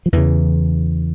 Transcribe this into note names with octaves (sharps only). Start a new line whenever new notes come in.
F3
E2 C#3 E3